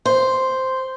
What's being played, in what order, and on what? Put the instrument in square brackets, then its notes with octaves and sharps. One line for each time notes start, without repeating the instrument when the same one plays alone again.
[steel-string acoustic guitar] C5